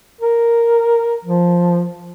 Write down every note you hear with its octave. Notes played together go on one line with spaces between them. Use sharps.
A#4
F3